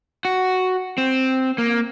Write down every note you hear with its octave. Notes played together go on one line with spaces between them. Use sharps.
F#4
C4
A#3